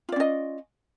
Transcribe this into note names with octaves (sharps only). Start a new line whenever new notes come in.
C#4 F4 D5 D#5